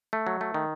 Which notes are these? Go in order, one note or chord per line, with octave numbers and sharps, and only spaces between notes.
A3
F#3
A3
D#3